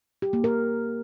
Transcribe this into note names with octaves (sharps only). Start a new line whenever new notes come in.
G4
A#3
A#4